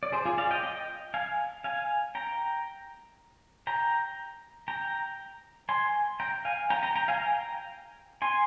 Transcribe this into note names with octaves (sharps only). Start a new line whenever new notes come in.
D5
G#4 C5
F4 G#4
D5 F5
D#5 G5
D#5 G5
F5 G#5
F5 G#5
G5 A#5
G5 A#5
G5 A#5
G#5 C6
G5 A#5
F5 G#5
G5 A#5
G5 A#5
G5 A#5
F5 G#5
G5 A#5
G#5 C6